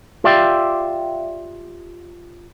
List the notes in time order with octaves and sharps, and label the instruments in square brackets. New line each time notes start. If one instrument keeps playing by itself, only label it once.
[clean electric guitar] F4 G4 D5 E5 F5 G5